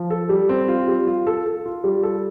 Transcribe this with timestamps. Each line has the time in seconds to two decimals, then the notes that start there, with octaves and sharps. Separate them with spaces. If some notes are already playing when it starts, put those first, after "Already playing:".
Already playing: F3
0.10 A4
0.29 G3
0.49 C4
0.68 F4
0.88 G3
1.07 F4
1.27 A4
1.46 A4
1.66 F4
1.84 G3
2.03 A4